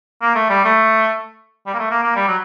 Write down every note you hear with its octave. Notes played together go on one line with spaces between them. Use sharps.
A#3
A3
G3
A3
G3
A#3
A3
A#3
A#3
G3
F#3